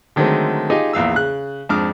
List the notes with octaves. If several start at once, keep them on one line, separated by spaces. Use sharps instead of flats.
D3 D#3 F#3 G#3 A3 C4
D#4 F4 G4 G#4 D#5
A#1 E2 F5 E6
C#3 F#6
F2 G#2 D4 D6 D#6 F6